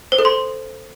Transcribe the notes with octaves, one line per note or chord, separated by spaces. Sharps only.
C5
A4
C6